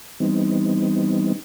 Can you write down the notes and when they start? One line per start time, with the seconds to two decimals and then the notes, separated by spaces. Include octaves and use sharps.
0.20 E3 G3 B3 C4 D#4